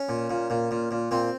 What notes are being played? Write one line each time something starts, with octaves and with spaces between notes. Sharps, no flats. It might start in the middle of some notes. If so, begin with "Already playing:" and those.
Already playing: C#4
A#2
A#2
A#2
A#2
A#2
A#2 C4